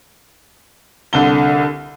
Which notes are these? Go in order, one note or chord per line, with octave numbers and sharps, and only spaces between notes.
C2 D3 G7